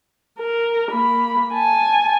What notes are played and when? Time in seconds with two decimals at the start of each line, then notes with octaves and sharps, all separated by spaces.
0.38 A#4
0.91 A#3 B5
1.53 G#5 A5